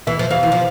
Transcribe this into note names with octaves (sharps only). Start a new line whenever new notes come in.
E3 E5
F3
E3 F5
E3
F3